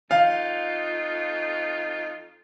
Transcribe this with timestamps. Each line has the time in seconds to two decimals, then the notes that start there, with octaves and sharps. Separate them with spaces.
0.11 F2 D#4 F4 F5